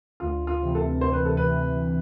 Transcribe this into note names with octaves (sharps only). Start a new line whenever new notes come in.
D2 F4
F4
C3 E3
A4
D2 C5
B4
A4
C3 E3 B4